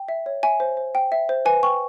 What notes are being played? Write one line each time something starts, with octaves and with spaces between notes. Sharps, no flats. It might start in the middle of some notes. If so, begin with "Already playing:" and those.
Already playing: G5
E5
C#5
E5 G#5
C5
C5
G5
E5
C5
B4 G#5
G5 C#6